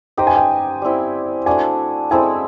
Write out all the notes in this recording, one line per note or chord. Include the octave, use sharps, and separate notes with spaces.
D#4 G4 C5 D#5 G5
G#5
G5
G3 C4 E4
A3 D4 F#4 G#5
G#3 C4 E4 A4 G#5